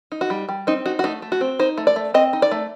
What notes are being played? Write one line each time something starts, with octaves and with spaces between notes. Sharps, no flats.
D#4
F#4
G3
G3
C4 D#4
D#4 F#4
F#4
A3 D#4
A3
F#4
C4
D#4 C5
A3
D5
A3
C4 D#5
D#4
D5
A3